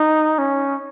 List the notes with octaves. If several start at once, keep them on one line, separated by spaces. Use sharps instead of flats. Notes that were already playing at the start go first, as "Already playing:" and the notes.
Already playing: D#4
C#4